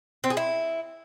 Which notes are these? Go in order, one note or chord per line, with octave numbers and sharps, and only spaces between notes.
C4
G#4
E4